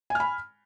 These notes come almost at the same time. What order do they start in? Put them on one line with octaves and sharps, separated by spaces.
G#5 F6 B5